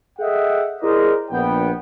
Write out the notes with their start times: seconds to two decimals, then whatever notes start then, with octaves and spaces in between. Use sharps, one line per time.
0.19 G#4 A4 D#5 E5 F#5 G5
0.81 E4 G#4 A#4 C5 D5 D#5
1.31 A#1 B3 G5